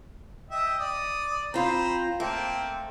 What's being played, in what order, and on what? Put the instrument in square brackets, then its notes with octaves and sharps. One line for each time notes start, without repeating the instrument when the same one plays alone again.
[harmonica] D#5 E5 G5
D5 D#6
[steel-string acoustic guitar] C4 F4 [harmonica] C5 A#5 B5
[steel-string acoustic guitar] A3 [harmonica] A#3 C4 C5